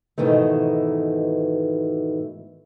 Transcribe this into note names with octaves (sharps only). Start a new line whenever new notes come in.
G#2 B2 D#3 E3 A3